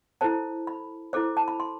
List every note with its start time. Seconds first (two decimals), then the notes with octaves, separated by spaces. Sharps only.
0.21 E4 A4 C5 A5
0.67 B5
1.13 E4 A4 C5 D6
1.37 A5
1.48 B5
1.60 C6